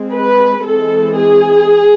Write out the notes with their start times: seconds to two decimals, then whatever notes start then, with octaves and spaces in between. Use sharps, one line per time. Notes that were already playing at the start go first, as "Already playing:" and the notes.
Already playing: G#3 C4
0.11 B4
0.63 E3 G#3 C4 A4
1.16 G#4